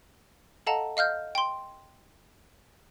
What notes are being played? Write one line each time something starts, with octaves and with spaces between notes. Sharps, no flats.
A4 D#5 F5 F#5 A5 A#5
D#5 F5 F6 G6
G5 C6